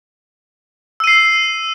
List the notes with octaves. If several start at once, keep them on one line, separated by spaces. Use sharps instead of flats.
E6 C7 D#7